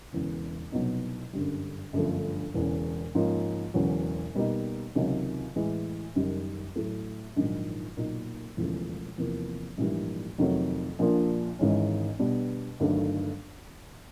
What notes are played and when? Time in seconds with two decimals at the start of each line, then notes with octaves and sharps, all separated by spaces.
0.12 E1 E2 C#3
0.72 C2 B2 F#3 B3 D#4
1.33 G1 F#2 D3 G3
1.93 G1 F#2 D3 F3 A3
2.54 E1 E2 C#3
3.15 G#2 F3 A#3 C#4 F4
3.74 E1 E2 C#3 F#3
4.35 B2 G3 A#3 D#4
4.95 C#2 C3 D#3 F#3
5.56 A2 E3 G#3
6.15 F#1 F#2 D#3 G3
6.76 A2 F#3 A3
7.36 A#1 G#2 D#3 F#3
7.97 B1 A#2 F#3 A#3 D#4
8.57 E1 E2 C#3 F3 A3
9.18 E2 C3 F3 A#3
9.78 A#1 G#2 E3 G3 A#3
10.38 F2 C3 D#3 F#3 A3
10.99 A#1 A#2 F3 A#3 D4
11.59 G#1 G#2 E3 G#3 C#4
12.19 B2 G3 B3 D4
12.80 G1 G2 D#3 F#3 A3